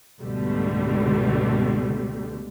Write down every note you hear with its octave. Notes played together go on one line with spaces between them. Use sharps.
C#2 G#2 B2 D3 G3 A3